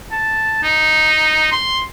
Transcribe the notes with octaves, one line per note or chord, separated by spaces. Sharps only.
A5
D#4
C6